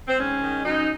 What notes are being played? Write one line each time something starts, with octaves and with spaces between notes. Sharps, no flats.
C4
G#2 C#4
D#3 G#3
F#2 D#4